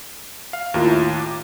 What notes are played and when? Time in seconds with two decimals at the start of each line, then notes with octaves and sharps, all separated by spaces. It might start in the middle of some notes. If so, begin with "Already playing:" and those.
0.53 F5
0.74 D#2 A2 E4 F4 A#4
1.20 D6